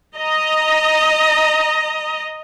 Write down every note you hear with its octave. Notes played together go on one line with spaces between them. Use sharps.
D#5 A#5